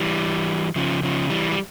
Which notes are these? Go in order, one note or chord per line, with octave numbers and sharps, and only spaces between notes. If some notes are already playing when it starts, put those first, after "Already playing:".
Already playing: E3 G3
C#3 F3
C#3 F3
E3 G3
G3